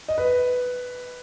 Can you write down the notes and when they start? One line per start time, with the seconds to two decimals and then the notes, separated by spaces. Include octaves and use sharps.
0.08 D#5
0.18 B4